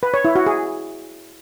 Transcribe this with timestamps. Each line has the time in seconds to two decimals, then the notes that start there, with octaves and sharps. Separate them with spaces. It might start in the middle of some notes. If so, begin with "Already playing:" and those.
0.03 B4
0.14 C#5
0.25 E4
0.36 F#4
0.46 G#4